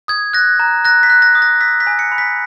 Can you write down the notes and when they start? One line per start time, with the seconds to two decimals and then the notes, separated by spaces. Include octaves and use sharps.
0.08 D#6 G#6
0.33 F#6 A#6
0.60 A#5
0.85 F#6 A#6
1.03 B6
1.10 F#6
1.22 A#6
1.35 D#6
1.42 A#6
1.60 E6 B6
1.80 B6
1.87 G#5
1.99 C#7
2.12 B5
2.18 B6